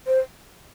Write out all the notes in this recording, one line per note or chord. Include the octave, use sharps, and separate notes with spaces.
C5